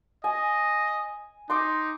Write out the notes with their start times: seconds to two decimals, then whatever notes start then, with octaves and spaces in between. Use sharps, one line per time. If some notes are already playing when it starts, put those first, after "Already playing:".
0.24 D#5 G#5
1.50 D#4 C6 D6